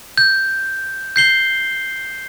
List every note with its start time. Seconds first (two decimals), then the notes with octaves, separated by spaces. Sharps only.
0.18 G6
1.16 G6 C7 G7